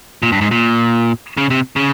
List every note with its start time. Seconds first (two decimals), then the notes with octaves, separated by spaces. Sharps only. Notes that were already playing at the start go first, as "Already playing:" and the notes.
0.22 A#2
0.32 G2
0.41 G#2
0.51 A#2
1.37 C#3
1.50 C3
1.76 C#3